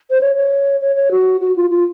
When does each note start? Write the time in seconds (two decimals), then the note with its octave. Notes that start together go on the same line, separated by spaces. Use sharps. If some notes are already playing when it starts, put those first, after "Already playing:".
0.10 C5
0.21 C#5
0.36 C#5
0.81 C#5
0.96 C#5
1.11 F#4
1.41 F#4
1.56 F4
1.70 F4